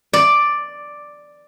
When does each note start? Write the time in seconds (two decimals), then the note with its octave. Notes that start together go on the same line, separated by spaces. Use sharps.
0.13 D5